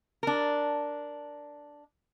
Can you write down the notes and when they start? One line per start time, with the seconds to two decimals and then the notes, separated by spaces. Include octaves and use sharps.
0.23 D4 A#4